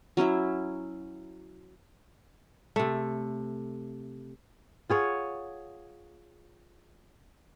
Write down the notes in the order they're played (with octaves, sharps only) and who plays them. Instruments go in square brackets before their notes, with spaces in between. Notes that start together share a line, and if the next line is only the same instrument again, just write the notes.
[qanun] F#3 C#4 E4 E5
[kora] C3 A3
F4 G#4 C#5 F#5